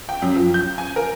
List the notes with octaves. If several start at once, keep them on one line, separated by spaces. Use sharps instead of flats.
G5
F#2
F3
G6
G#5
A#4